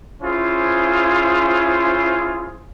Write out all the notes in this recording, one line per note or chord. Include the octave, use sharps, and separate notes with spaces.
C#4 E4 F4 G#4 C5